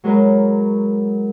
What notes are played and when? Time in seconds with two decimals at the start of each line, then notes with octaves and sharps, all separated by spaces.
0.04 F#3 G#3 A#4 B4 C#5